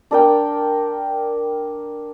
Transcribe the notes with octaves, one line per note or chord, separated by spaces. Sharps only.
D4 A#4 G5